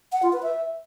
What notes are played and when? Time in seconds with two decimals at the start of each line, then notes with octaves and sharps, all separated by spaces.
0.12 F#5
0.23 F4
0.33 B4
0.43 E5